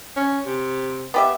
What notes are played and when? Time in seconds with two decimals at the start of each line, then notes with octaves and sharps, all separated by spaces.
0.16 C#4
0.46 C3
1.14 B3 G4 E5